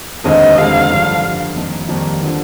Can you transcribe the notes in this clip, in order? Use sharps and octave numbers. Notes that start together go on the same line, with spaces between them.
F1 D#2 D3 G#3 C4 D#5
F1 D#2 D3 G#3 C4 F5
G2 D3 F3
G2 D3 F3
F2 D#3 G3 A#3 D#4
F2 D#3 G3 A#3 D#4
D3 F3